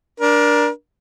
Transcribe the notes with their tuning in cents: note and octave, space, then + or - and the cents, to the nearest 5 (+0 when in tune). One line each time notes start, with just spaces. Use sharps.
D4 +0 A#4 +25